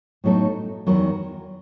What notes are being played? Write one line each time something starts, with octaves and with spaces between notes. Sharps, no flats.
A2 F#3 B3 D#4 A4
E2 D#3 F#3